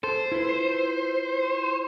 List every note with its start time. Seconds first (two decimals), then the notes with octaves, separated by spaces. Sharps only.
0.04 A4 C5
0.32 E4 F4 B4